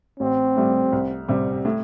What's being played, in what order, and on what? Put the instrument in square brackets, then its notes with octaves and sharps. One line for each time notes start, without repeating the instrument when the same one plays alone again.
[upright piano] A1 [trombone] C4
[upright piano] A2 G3
C2
C3 G3 C4
A2